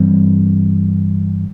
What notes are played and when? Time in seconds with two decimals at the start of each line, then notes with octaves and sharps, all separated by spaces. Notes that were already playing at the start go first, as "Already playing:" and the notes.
Already playing: G2 E3 G3 C4